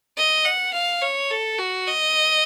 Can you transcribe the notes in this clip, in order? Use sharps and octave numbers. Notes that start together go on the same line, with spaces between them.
D#5
F#5
F5
C#5
A4
F#4
D#5